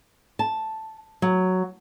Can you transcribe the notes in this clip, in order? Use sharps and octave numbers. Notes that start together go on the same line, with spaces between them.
A5
F#3